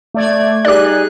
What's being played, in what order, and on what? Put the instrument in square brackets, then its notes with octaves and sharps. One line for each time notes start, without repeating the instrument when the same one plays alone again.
[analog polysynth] A3 D5 G#6
[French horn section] G3 D#4 G#4 [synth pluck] G4 D5 [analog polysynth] F#6